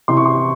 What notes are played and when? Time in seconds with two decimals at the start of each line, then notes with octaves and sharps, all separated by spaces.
0.08 C3 E3 C6
0.17 C#6
0.26 C6